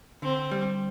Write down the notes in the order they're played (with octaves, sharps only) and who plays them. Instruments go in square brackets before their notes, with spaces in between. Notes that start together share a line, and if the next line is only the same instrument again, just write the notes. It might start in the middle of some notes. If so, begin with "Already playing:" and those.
[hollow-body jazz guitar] D3 [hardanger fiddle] C4
[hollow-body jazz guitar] G3